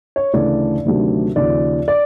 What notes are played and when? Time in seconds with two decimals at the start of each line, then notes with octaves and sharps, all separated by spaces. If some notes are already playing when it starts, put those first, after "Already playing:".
0.16 C#5
0.33 D2 C#3 E3 A3 D4 D5
0.85 D2 C3 D#3 F#3 A3
1.36 D#2 C#3 F3 D5
1.88 D5